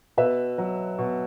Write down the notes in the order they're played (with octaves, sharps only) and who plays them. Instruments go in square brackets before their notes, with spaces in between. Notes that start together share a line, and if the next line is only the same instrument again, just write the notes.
[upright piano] B2 B4 E5
F#3
B2